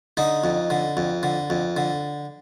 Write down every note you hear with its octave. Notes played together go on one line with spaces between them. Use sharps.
D3 D#4
F2
D3
F2
D3
F2
D3